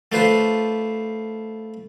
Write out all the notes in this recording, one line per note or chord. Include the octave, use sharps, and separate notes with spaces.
A3 D4 F4 B4 C5